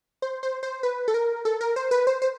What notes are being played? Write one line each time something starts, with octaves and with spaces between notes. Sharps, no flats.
C5
C5
C5
B4
A4
A#4
A4
A#4
C5
B4
C5
C5